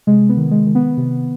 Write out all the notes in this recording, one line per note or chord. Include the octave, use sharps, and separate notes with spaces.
C3 G#3
B3
D#3
G#3
D#3
B3
C3